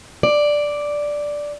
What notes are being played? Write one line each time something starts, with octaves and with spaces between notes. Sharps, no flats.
D5